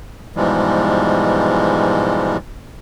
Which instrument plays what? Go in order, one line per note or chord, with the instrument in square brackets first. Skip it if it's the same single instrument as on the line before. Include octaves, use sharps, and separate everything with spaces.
[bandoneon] G#2 B2 E3 F3 G3 G#3